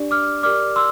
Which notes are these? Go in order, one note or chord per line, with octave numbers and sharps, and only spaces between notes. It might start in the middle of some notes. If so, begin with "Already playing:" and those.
Already playing: D4 G4 D5
D6 F6
G4 A#4 D5 D6 F6
C6 E6